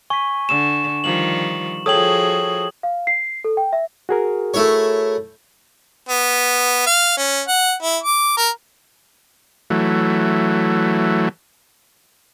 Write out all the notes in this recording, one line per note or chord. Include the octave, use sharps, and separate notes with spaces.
G#5 C#6 B6
D3 E7
D#3 F3 G3 F#7
F3 F#4 G#4 A4 C#5 G5 D#6 F#7
F5
C7
A4
G5
E5
F#4 G#4 A#4
A3 E4 C#5
B3
F5
C#4
F#5
E4
D6
A#4
E3 F#3 A3